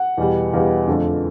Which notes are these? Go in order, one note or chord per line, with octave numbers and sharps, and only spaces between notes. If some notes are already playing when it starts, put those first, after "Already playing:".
Already playing: F#5
E2 B2 G3
E2 B2 G3 F5
F2 D3 F3 A3